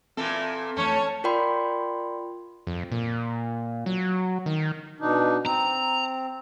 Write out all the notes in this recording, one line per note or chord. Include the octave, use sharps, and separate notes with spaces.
A#2 E3 C4 A4
F2 E3 A3 C#4 C#5 A5
F4 A#4 D5 G5 B5 C6
F2
A#2
F#3
D#3
B2 D4 D#4
C4 A#5